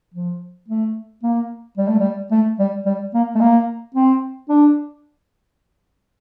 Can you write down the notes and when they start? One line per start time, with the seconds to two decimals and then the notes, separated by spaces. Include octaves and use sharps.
0.14 F3
0.68 A3
1.23 A#3
1.77 G3
1.88 A3
1.99 G3
2.31 A3
2.59 G3
2.85 G3
3.14 A#3
3.35 A3
3.40 A#3
3.94 C4
4.49 D4